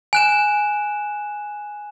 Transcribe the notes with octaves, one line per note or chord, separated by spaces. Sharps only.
G#5 F#6 E7